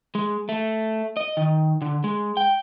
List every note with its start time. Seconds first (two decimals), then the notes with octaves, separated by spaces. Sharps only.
0.15 G#3
0.49 A3
1.17 D#5
1.37 D#3
1.82 D3
2.04 G#3
2.37 G5